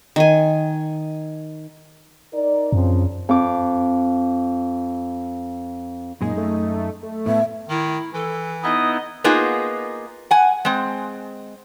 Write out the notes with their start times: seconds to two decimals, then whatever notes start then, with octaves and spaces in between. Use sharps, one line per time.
0.16 D#3 G#5
2.34 D#4 A#4 D5
2.72 F#2 C#3 F3 C4
3.29 F2 D6
6.21 F#2 A#2 G#3 D#4 G#4
6.37 A3
7.03 A3
7.26 A2 B3 E5
7.69 D#3 E4
8.13 E3 A4
8.63 B3 D#4 E4 D#5 D#6
9.24 A#3 B3 D#4 F4 G#4
10.31 F#5 G#5
10.65 G#3 C4